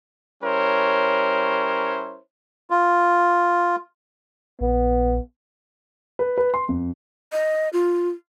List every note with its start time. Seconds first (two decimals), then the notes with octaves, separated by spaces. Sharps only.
0.43 G3 C#4 E4 A#4 C5 C#5
2.70 F4
4.61 A#1 B3
6.19 B4
6.38 B4
6.54 C6
6.69 F2
7.32 D#5
7.73 F4